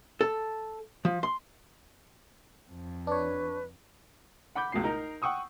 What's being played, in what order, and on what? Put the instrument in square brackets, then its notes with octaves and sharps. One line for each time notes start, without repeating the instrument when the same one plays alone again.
[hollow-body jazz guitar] A4
F3
C6
[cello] F2
[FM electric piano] D4 C#5 [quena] B4
[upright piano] F#5 B5 D6 G6
C#2 B2 C7
D#4 A#4
F#5 G5 C#6 D#6 E6